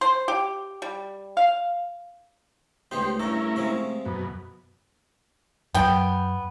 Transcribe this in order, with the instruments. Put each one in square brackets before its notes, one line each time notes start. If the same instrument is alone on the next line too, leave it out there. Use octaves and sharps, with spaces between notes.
[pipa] C5
G4
G3
F5
[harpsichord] C#2 B3 D#4 [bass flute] A3 [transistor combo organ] G4 C5
[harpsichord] G2 A4 [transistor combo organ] C#4 E4 A#4
[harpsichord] C3 F3 G#3
[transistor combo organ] F#2 B2
[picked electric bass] F#2 F#3 [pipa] B3 G5